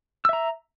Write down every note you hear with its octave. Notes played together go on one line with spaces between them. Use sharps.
E5 A#5 E6